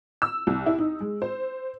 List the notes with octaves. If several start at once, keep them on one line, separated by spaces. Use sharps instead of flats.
E6
C2
E4
D#4
G#3
C5